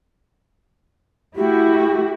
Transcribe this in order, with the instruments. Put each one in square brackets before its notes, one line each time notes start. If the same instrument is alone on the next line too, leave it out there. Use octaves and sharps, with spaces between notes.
[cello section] A3 E4 F#4 [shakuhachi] G4